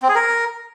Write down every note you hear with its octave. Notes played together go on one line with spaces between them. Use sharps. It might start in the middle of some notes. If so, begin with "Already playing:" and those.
C4
G#4
A#4